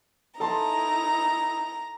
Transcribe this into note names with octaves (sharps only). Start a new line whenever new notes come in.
D#4 E4 A4 A5 A#5 C6